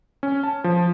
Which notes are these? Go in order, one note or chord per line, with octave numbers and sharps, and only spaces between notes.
C#4
A5
F3